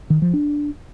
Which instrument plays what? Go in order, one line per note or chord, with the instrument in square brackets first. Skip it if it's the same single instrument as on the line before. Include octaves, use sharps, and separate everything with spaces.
[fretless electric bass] D#3
F3
D4